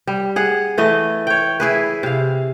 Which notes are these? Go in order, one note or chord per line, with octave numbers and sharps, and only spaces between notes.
G3
G#4 F#5
E3 A3 D#5
C#5 G5
E4 G#4 B4
C3 F5